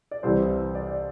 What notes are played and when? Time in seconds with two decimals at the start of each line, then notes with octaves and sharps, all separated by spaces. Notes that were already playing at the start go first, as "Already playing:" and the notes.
0.11 D5
0.23 C2 C3 E3 C5
0.75 D5